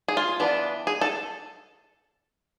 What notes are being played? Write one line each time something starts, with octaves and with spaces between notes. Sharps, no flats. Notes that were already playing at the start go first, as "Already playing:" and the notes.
G#4
F4
E3 B3 D4
G#4
A4